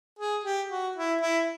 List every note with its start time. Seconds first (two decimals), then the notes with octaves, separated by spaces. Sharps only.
0.19 G#4
0.44 G4
0.71 F#4
0.96 E4
1.21 E4